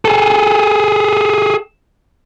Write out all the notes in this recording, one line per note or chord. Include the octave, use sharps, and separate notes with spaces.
G#4 A4